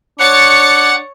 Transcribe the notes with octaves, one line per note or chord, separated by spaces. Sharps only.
D4 C#5 F#5 F#6 A6 C#7